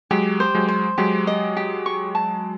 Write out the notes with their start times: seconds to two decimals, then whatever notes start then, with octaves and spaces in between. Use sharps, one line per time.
0.11 F#3 G#3 G4
0.40 C5
0.55 F#3 G#3
0.68 C5
0.98 F#3 G#3 G4
1.27 D#5
1.57 G4
1.86 C#6
2.15 A5